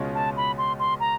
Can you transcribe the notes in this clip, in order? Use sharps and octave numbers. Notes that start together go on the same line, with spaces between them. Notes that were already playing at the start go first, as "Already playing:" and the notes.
Already playing: C#2 B2 G#3 C#4 F4
A5
B5
C6
C6
A#5